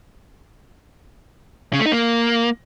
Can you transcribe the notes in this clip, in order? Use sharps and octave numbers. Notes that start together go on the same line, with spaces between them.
C#3
A3
D#4
A#3